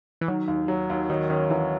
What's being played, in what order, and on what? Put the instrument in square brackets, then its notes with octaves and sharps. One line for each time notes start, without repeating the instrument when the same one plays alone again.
[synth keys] E3
[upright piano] D#3 [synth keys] F#3
[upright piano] D#2
F#3
D#2
[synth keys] D#3 [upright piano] F#3
[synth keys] D#3 [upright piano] C#4
[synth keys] E3 [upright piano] F#3